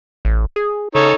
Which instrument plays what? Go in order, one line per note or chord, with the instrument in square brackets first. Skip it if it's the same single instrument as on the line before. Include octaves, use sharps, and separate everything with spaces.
[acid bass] A1
G#4
[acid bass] C#3 [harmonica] D#4 A4 C#5